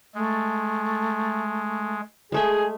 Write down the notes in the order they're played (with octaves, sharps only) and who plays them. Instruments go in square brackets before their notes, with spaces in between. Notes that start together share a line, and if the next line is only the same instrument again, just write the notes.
[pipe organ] G#3 [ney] A3
[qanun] G#3 A3 E5 [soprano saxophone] G#4 [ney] G#5